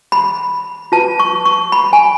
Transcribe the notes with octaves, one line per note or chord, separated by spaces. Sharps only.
B5
F4 B4 A5
C#6
C#6
B5
G#5